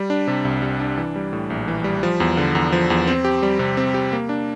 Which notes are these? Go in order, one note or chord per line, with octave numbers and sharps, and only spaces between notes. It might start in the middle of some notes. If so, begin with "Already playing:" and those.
Already playing: G3
D4
C3
C2
G3
D4
E3
G3
A2
A#1
E3
G3
F3
E2
D3
E2
F3
E2
C4
G4
G3
C3
C4
G4
A#3
D4